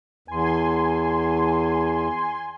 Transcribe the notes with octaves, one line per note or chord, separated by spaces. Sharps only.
E2 G#5 C6